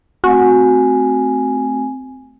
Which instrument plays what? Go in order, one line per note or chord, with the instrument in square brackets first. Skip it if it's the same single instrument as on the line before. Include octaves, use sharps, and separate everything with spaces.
[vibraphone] A3 C4 G#5 [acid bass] F#4